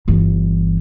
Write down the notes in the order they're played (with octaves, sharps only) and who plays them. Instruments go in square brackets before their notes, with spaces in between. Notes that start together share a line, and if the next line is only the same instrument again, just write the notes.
[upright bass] G1 E3